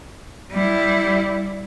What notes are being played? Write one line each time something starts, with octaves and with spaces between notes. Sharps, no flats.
G3 E4